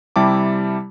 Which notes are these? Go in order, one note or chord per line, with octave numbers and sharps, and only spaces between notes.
C3 G3 E4 A5 D6